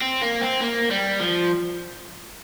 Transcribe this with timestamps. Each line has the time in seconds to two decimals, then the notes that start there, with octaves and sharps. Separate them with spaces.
0.02 C4
0.22 A#3
0.42 C4
0.61 A#3
0.91 G3
1.20 F3